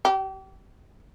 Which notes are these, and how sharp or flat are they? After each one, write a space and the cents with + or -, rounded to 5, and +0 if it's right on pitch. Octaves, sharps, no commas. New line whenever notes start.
G4 -35